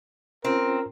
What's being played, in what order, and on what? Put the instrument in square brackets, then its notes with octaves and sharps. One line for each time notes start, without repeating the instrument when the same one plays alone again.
[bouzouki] C4 [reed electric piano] C#4 F4 C5 [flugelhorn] A#4